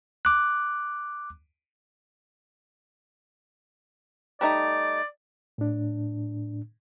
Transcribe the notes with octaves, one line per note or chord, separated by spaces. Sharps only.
D6 F#6
G3 A3 D#4 D5
A2 D4